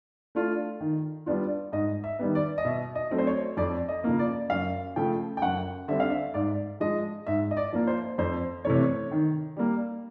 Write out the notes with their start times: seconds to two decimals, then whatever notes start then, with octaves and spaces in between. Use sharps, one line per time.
0.35 A3 D4 F4
0.80 D#3
1.26 G3 B3 D4 F4
1.72 G#2 D#5
2.04 E5
2.19 D#3 G3 B3
2.35 D5
2.58 D#5
2.65 B2 E5
2.95 D#5
3.11 F#3 A3 C4
3.18 C5
3.27 C#5
3.57 F2 D5
3.89 D#5
4.04 C#3 F3 A#3
4.19 D5
4.50 F#2 F5
4.96 C#3 F3 A3 G5
5.37 G5
5.42 F#2 F#5
5.88 D3 G3 C4 E5
6.00 F5
6.10 E5
6.34 G#2 D5
6.80 F3 G#3 D#5
7.27 G#2 E5
7.51 D#5
7.57 D5
7.73 F3 A#3
7.87 C5
8.18 F2 C5
8.65 C3 E3 A3 C#5
9.11 D#3
9.57 G3 A#3